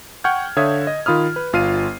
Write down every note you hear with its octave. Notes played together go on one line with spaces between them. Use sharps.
F#5 G5 C#6 F6 G6 G#6
D3 C#5 E5 F5 D#6 G#6
D#5
D#3 F4 B5 D#6 F6
B4
G1 F4 F6 C7 D#7